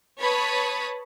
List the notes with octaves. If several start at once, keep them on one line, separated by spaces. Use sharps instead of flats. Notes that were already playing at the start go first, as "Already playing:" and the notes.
B4 C#5 A5 B5 D#6